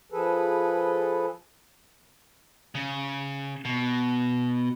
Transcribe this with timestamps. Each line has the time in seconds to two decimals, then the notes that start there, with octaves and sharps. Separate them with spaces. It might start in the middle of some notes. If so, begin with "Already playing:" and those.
0.12 F3 G#4 A4 B4
2.75 C#3
3.65 B2